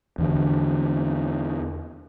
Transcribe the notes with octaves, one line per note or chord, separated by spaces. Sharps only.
E2 D3